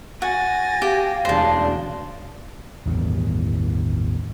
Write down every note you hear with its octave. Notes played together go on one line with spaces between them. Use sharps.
F#4 G#5 A6 A#6
G4 F5
E1 D2 C#3 D4 C5 A5 A#6
A1 E2 G2 D#3